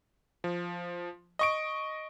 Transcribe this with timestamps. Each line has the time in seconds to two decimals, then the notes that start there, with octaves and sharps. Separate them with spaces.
0.44 F3
1.39 D#5 C#6 D7